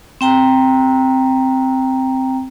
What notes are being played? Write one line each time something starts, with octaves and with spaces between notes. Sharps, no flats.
C4 G5 A#5